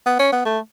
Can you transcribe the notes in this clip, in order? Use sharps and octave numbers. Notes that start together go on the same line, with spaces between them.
B3
C#4
B3
A3